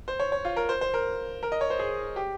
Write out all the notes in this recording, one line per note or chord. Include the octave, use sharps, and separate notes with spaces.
C5
C#5
C#5
F4
A#4
C5
C5
A#4
A#4
D#5
C#5
C5
G#4
G4